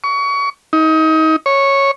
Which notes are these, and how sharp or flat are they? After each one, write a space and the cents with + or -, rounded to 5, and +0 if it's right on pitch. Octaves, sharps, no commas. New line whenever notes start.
C#6 +30
D#4 +30
C#5 -5